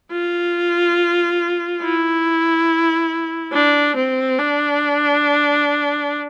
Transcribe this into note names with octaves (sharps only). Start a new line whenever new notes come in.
F4
E4
D4
C4
D4